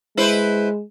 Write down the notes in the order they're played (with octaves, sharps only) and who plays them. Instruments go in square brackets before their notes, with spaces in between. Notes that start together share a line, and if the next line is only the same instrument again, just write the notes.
[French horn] G#3 [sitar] E4 B4 C5